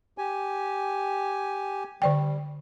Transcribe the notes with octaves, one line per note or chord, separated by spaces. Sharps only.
G4 G#5
D3 G3 D5 G5